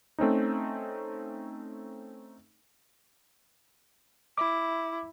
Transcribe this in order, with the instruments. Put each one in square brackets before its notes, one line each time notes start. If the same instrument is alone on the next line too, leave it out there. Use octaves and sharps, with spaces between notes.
[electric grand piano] A3 C4 C#4 D#4
[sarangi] E4 [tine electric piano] D6